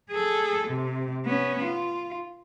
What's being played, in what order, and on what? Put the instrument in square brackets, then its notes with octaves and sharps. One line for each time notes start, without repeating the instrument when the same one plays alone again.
[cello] G#4 A4
C3
B3 C#4
F4